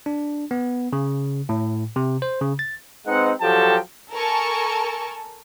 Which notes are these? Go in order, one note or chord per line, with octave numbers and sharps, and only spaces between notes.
D4
B3
C#3
A2
C3
C5
C#3
A6
G#3 C4 D#4 B4 F#5
F3 F#3 G4 A4 G5 A5
A4 A#4 G#5 A5 C#6